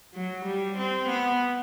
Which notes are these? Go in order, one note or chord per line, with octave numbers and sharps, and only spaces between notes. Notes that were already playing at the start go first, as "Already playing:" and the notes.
F#3
G3
C4
B3